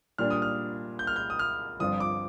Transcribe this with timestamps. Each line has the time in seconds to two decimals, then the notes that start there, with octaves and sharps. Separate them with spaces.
0.18 A#2 G3 D4 F6
0.30 D#6
0.42 F6
0.99 G6
1.07 F6
1.16 G6
1.30 D#6
1.39 F6
1.80 G1 G2 F3 C4 F4 D#6
2.00 D6